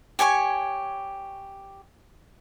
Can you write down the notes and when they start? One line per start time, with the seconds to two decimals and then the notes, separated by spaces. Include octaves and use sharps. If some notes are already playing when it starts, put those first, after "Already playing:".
0.19 G4 C#5 G#5 C#6